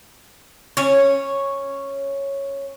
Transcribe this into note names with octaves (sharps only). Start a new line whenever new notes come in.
C#4 C#5